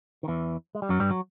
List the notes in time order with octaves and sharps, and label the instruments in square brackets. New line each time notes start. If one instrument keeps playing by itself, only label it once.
[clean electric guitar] D#3
E2 E3
G#3
G3
F#2 F#3
G2 G3
F#3